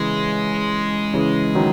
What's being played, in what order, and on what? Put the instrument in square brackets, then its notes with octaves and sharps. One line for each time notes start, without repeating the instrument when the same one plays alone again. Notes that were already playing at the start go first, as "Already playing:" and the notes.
Already playing: [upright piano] C#3 E3 [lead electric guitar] G#3
[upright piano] C#3 E3
D#3 F#3